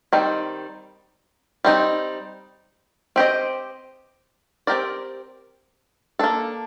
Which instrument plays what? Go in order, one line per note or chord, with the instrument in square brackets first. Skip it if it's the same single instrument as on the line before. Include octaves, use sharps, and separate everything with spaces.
[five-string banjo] D#3 G3 C4
G3 C4 D#4
C4 G4 C5 D#5
C4 G4 A#4 D5
A#3 D4 A4